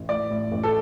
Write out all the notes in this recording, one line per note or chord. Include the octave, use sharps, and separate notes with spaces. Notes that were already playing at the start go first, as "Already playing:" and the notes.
Already playing: A1
A2 D5
A2
A1
A4